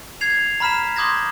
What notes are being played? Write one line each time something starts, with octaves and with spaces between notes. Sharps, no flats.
G#6 C7 F7
A#5 B5 F6 B6 E7
C6 D6 D#6 G6 G#6 A#6